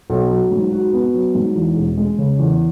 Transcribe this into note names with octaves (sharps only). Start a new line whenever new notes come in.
B1
F#3
G#2
F#4
B3
F#3
G#2
E2
E1
G#3
C#3
E2